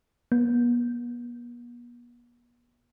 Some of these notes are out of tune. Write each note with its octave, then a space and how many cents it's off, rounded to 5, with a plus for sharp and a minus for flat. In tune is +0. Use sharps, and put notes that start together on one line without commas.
B3 -45